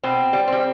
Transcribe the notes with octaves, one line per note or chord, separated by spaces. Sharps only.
B2 C4
G3
G3 C4